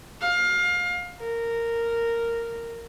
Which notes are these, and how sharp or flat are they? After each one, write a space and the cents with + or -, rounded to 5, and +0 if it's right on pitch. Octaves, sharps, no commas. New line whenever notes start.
F5 +25
A#4 -10